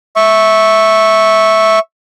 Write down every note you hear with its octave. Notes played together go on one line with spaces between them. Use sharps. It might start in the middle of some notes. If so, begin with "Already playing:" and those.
E5 C#6